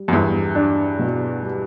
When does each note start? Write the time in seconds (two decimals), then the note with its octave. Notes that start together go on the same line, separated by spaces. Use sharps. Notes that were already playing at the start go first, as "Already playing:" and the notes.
Already playing: G3
0.08 F#2
0.13 E2 G2
0.55 D4
0.99 B2
1.42 G3